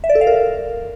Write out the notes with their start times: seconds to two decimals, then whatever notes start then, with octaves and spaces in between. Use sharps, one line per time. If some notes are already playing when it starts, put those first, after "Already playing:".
0.04 E5
0.09 D5
0.15 A4
0.21 F5
0.27 A#4